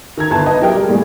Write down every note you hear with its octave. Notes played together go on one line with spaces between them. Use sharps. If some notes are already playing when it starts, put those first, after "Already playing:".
D#3 A#5 G#6
G1 E4 A5
B4 D#5 A5
F#3 E4 G4 A#4 G5
G3 G#3
A2 G3 G#4